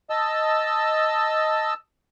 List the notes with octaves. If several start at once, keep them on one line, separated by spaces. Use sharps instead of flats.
D#5 A5 E6